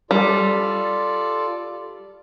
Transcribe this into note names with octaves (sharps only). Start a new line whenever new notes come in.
G3 F4 A4 D5